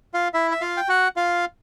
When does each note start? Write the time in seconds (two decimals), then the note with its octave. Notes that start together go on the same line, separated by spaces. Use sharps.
0.14 F4 F5
0.34 E4 E5
0.51 E5
0.61 F4 F5
0.77 G5
0.88 F#4 F#5
1.16 F4 F5